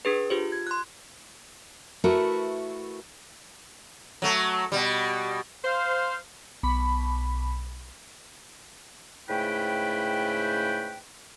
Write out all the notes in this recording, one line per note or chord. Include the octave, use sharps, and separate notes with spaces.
D4 G#4 B4
F4 G4 C5
G#6
C6 F#6
A3 E4 F#4 A#4 B4
F#3 A3
B2 G3
C5 F5
B1 B5
G#2 C#3 A3 E4 B4 G5